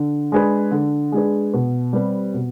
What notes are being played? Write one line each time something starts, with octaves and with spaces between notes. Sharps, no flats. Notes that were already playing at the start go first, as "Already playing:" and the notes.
Already playing: D3
G#3 D4 G#4 B4
D3
G#3 D4 G#4 B4
B2
G3 C4 G4 B4
B2